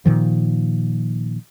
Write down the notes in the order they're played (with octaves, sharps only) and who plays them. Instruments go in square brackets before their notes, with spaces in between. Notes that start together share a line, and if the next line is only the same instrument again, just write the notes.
[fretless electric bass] A#2 D#3 F3